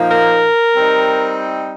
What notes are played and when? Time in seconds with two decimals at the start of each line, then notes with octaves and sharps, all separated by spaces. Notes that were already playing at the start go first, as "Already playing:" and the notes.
Already playing: A#2 F3 A#3 D#4
0.10 A#4
0.76 G3 C4 D#4